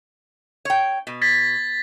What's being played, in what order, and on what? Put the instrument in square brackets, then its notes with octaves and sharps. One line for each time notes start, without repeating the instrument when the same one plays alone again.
[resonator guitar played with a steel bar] C#5 G5
B2
[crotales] G#6 A6 B6